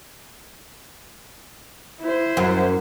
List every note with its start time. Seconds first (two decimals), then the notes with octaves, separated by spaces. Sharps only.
2.01 E4 C5
2.37 F#2